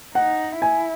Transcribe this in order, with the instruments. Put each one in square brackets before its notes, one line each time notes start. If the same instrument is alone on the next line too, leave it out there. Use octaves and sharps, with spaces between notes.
[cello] D#4 [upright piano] F#5
[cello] E4 [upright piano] G#5